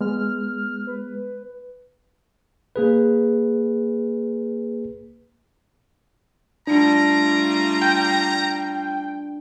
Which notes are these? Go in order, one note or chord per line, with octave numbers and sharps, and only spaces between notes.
G#3 B3 F6
B4
A#3 G#4 B4
G3 A3 D4 F4 A#5
G5